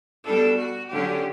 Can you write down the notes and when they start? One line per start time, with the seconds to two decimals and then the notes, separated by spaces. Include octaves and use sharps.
0.25 B2 G3 D4 A4
0.58 F#4
0.91 D3 F#3 C#4 G4